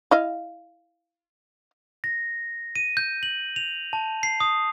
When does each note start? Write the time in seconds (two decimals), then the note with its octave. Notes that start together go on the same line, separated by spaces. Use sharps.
0.11 E4 D#5 F5
2.04 A#6
2.76 D#7
2.97 G6
3.23 F#7
3.56 F7
3.93 A5
4.23 C7
4.40 D#6